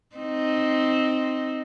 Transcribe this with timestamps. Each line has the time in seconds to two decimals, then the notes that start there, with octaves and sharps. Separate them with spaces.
0.17 C4 D#4